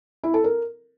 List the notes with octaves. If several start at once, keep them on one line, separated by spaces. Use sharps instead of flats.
E4
A4
A#4